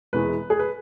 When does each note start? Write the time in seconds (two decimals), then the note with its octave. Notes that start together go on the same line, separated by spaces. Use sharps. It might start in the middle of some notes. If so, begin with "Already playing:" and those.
0.13 E1 E2 E3 G#3 B4
0.50 G#4
0.59 B4